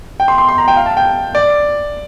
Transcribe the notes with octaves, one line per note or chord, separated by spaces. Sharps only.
G5
C6
C6
C6
A#5
G5
F5
A5
G5
D5